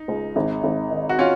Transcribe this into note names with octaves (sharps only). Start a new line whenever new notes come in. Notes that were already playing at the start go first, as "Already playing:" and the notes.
Already playing: D#4
C#2
G#1
G#1
D#3
F#4
C#4 F4